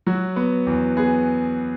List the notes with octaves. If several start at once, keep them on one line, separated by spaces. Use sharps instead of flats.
F#3 F#4
B3
E2
B3 G#4